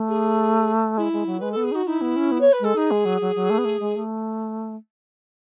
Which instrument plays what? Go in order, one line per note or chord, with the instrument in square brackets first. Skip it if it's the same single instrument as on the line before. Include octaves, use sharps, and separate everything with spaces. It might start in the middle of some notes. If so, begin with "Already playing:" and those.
Already playing: [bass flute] A3
[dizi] G#4
[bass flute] G#3 [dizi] E4
[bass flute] G#3
F#3
[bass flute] G#3 [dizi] B4
[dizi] A4
[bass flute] B3
[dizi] G#4
[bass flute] D#4 [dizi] F#4
[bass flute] D#4 [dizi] E4
[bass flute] B3
C#4
B3
[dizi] C#5
B4
[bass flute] G#3 [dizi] A4
[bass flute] D#4 [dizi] G#4
[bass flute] G#3
F#3
F#3
F#3
A3
B3
A3
G#3
A3